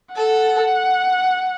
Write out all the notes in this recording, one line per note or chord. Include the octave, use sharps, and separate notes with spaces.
A4 F#5